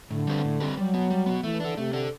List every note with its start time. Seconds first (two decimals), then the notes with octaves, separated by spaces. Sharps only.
0.11 A2 D3
0.27 G3 C4 G4 B4
0.44 A2
0.60 G3 C4 G4 B4
0.77 F#3 G3
0.94 B3 F#4
1.10 G3
1.26 B3 F#4
1.43 E3 A3
1.60 D4 A4
1.77 C3 A3
1.93 D4 A4